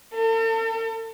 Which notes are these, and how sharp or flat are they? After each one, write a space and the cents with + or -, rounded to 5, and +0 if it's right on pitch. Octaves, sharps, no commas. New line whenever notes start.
A4 +45